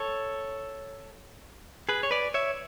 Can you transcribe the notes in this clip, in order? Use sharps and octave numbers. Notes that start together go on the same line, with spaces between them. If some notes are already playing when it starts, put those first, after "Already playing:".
Already playing: A4 C#5
G#4 B4
C#5
B4 D5
C#5 E5